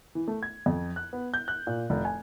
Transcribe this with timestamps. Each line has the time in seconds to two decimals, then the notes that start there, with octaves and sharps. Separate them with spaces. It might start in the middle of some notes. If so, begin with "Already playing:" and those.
0.15 E3
0.28 A3
0.43 G#6
0.66 F2
0.96 F#6
1.13 B3
1.34 G6
1.48 F#6
1.67 A#2
1.90 F1
2.05 G#5